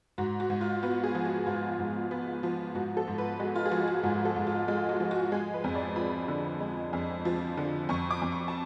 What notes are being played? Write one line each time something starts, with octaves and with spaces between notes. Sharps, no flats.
G#2 F#4
F#4
G#2
F4
B3 F#4
G#4
F3
F#4
G#2 F4
G#2
B3
F3
G#2 F#4
A4
G#2
B4
G#3 F#4
F4
G#4
F3 F#4
F#4
G#2
A4
G#2
F4
G#3 F4
F#4
F3
F#4
G#3 G#4
B4
F2
D5
F3 B5
D3
G#3
F2
F3
D3
F2 C#6
D6
F2
C#6
A5